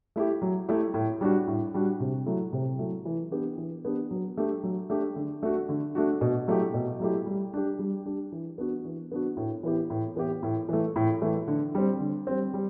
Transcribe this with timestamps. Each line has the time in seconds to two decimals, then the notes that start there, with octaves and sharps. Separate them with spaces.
0.16 A3 E4 G4
0.42 F#3
0.69 A3 E4 G4
0.94 A2
1.21 G3 D4 F#4
1.48 A2
1.74 G3 D4 F#4
2.00 C3
2.26 F#3 A3 E4
2.53 C3
2.79 F#3 A3 E4
3.05 E3
3.31 B3 D4 G4
3.58 E3
3.85 B3 D4 G4
4.11 F#3
4.37 A3 D4 G4
4.63 F#3
4.90 A3 D4 G4
5.16 D3
5.43 A3 D4 F#4
5.69 D3
5.95 A3 D4 F#4
6.21 B2
6.48 F#3 A3 E4 G4
6.74 B2
7.00 F#3 A3 E4 G4
7.26 G3
7.54 D4 G4
7.79 G3
8.06 D4 G4
8.32 E3
8.58 B3 D4 F#4
8.85 E3
9.12 B3 D4 F#4
9.37 A2
9.63 E3 B3 E4 G4
9.90 A2
10.16 E3 B3 E4 G4
10.43 A2
10.69 E3 A3
10.96 A2
11.22 E3 A3
11.48 D3
11.75 G3 C4
12.00 D3
12.27 G3 C4
12.54 G3